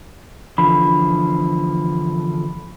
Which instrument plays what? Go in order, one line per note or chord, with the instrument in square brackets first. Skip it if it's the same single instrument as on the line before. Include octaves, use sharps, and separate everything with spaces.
[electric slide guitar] E2 D3 F3 [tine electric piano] B5